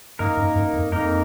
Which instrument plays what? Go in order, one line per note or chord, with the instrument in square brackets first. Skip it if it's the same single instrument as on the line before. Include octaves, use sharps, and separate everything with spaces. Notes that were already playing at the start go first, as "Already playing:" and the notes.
[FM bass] F#2 [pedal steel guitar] A#3 D#4 A#4
[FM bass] F#2
F#2
F2
[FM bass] F2 [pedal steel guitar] A#3 D#4 A#4